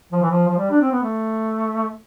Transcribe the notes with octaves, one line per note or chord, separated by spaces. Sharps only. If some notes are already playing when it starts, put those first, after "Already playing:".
F3
E3
F3
F3
G3
D4
C4
B3
A3